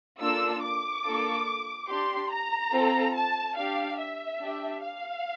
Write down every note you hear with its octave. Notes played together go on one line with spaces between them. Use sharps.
A#3 D4 F4 A4 E6
D6
A#3 D4 F4 A4
D4 G4 C6
A#5
C4 F4 A4
A5
D4 G4 F5
E5
D4 G4
F5